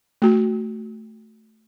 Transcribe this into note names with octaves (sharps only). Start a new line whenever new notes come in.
A3 F#4